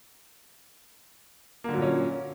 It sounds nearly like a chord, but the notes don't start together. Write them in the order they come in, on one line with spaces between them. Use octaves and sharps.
A#3 D3 F#3 A#2 C#4